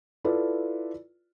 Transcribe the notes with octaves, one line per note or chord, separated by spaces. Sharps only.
E4 F4 A4 B4 D5